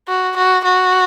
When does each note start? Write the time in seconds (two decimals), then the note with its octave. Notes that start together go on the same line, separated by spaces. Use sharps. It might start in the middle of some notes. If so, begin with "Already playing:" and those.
0.08 F#4
0.36 F#4
0.64 F#4